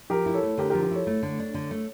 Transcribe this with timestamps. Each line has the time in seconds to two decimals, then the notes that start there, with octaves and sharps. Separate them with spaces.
0.10 F3 G4 A#4
0.26 E4
0.33 A4 C#5
0.43 A3
0.58 D3 G4 A#4
0.70 G4 A#4
0.74 F3
0.82 G4 A#4
0.91 E4 A4 C#5
1.07 A3
1.23 D3
1.39 D4
1.54 D3
1.71 A3